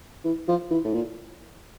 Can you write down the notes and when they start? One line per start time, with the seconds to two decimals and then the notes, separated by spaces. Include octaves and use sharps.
0.25 E3
0.48 F3
0.71 E3
0.85 A2
0.94 A#2